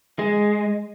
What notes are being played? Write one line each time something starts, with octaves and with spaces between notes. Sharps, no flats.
G#3